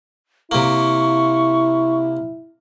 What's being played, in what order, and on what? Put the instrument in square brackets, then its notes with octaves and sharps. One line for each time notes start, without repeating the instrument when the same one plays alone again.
[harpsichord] C3 A#3 [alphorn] E4 [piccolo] C#6